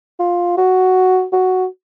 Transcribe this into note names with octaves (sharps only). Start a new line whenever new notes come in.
F4
F#4
F#4